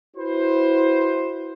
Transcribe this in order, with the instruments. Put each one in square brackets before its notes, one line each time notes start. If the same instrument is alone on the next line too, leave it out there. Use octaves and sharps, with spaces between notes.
[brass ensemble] E4 F#4 B4 C5